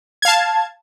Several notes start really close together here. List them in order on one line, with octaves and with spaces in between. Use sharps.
G#6 F5 A5